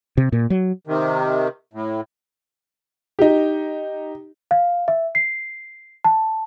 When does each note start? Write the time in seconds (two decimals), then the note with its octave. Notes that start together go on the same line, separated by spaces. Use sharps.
0.17 C3
0.32 A#2
0.50 F#3
0.87 C3 D#3
1.73 A2
3.19 D#4 G4
4.51 F5
4.88 E5
5.15 C7
6.04 A5